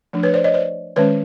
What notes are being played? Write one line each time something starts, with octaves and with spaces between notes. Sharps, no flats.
F3 A3 D4
B4 C#5
C5 D5
C#5 D#5
C5 D5
D#3 G#3 C#4 B4 C#5